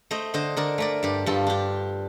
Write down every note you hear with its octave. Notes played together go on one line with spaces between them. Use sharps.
A3 C5 D#5
D3 C5 D#5
D3 A#4 D5
A3 A#4 D5
G2 G4
G2 F4 A4
D4 G4